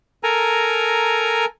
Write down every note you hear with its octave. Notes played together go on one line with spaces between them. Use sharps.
A4 A#4 G#5 A#5